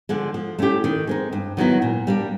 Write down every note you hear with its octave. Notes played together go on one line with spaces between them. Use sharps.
D3 F3 G#3
F3
A3 C#4 E4 G4
D#3
G#3 C4 D#4
G2
D#3 F#3 B3 E4
A#2
G3 A#3 D4